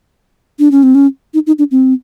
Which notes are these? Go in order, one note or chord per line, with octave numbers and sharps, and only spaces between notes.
D4
C#4
C4
C#4
D#4
D#4
D4
C4